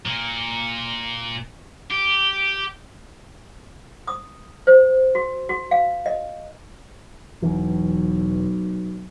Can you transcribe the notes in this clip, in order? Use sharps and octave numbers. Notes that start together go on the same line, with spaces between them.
A#2
G4
D#6
C5
F#4
F#4
F5
D#5
E1 B1 E3